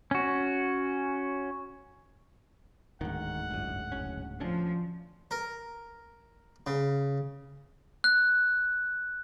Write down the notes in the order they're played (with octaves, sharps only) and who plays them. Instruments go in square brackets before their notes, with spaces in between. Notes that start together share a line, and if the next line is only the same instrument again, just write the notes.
[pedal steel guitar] C#4 F#4
[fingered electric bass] D1 G#2 [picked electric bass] D#3 [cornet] F#5
[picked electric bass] G1 F#2
F#1 C#4
[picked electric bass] D2 C#4 D4 [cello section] F3
[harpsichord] A#4
C#3
[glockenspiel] F#6